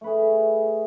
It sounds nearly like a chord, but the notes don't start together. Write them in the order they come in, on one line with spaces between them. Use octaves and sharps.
A3 B4 G#4